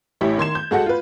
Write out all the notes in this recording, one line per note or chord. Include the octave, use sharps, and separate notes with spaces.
A1 E4 G4 C#5
D#3 C6 G#6 E7
G6
G#3 F#4 A4 F#5
F4 B4